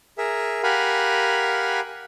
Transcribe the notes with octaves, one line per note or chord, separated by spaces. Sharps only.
G#4 A#4 E5
G4 A#4 F5 F#5 G#5 B5